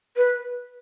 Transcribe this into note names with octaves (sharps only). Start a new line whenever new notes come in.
B4